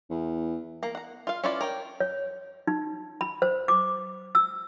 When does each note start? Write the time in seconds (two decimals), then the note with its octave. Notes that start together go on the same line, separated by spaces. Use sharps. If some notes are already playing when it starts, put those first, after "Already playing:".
0.10 E2
0.83 A#3 A#5
0.95 F#5 A#5
1.27 F4 F5
1.44 C#4 E4 F4 B4 D5
1.61 A#4 C#5 G5
2.00 C#5
2.67 D#4
3.21 B5
3.42 C5
3.68 D6
4.35 E6